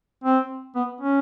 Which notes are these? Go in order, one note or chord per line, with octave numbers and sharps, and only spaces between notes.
C4
B3
C#4